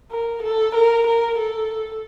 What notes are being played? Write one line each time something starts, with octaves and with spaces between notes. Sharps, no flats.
A#4
A4
A#4
A#4
A4